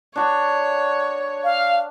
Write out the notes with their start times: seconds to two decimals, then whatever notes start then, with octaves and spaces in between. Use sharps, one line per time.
0.16 D4 F#4 C#5
1.44 F5